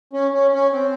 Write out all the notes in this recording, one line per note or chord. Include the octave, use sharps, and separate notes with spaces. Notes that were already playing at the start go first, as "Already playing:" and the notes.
C#4
C#4
C#4
C4